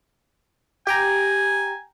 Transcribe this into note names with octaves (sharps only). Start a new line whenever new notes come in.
G4 G5 G#5 A#5